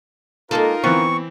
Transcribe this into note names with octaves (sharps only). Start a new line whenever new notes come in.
G#3 A#3 D#4 F4 A4 A#4
E3 B3 C4 C#6